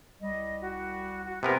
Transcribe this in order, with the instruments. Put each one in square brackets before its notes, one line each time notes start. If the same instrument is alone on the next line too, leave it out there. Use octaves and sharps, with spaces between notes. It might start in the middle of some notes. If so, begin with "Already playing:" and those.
[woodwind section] C2 G3 [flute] D#5
[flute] F#4
F#4
[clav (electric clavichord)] C3 B3 A#4 [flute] G#5